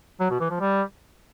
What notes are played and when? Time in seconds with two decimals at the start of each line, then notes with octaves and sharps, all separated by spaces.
0.20 F#3
0.30 B2
0.40 E3
0.50 F3
0.60 G3